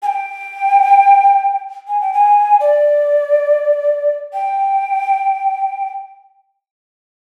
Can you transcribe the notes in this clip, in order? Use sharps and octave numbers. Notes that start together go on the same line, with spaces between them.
G#5
G5
G#5
G5
G#5
D5
G5